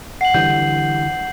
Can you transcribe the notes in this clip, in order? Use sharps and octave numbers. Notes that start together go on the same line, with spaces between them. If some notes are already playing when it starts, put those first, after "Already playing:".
F#5 C7 F#7
D3 E3 G3 G6